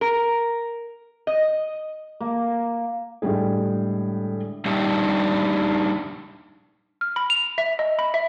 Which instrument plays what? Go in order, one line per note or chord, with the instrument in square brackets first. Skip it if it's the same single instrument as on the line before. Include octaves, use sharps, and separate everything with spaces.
[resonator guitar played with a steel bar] A#4
D#5
[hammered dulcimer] A#3
[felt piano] A2 D3 G3 G#3 G#4
[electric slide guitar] G3 D4 D#4 G4 E5
[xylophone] F6
B5
F7
E5
D#5
B5
E5